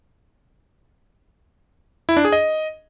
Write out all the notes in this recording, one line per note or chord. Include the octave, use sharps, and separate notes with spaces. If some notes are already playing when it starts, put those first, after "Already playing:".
E4
D4
G#4
D#5